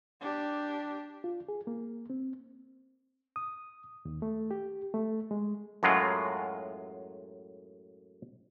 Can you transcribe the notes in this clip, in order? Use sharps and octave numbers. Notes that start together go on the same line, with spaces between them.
D4 G4
F4
G#4
A#3
C4
D#6
D#2
A3
G4
A3
G#3
F#2 A2 F#3 G#3 F4